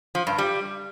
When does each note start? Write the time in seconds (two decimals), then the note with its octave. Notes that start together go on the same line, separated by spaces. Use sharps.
0.15 F3
0.27 G2
0.38 G3